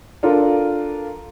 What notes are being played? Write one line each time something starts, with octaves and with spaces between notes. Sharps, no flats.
D4 F4 A4 A#4